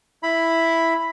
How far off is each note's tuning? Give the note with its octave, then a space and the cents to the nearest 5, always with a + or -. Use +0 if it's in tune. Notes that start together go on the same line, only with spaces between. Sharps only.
E4 +0 B5 +0